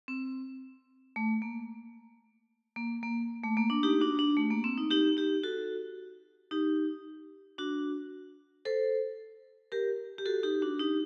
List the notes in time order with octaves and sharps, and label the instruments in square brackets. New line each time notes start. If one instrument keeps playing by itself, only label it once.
[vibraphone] C4
A3
A#3
A#3
A#3
A3
A#3
D4
D#4 G4
D4 F#4
D4
A3
A#3
C4
D#4
D#4 G4
D#4 G4
F#4 A4
D#4 G4
D4 F#4
A4 C5
G4 A#4
G4
F#4 A4
D#4 G4
D4 F#4
D#4 G4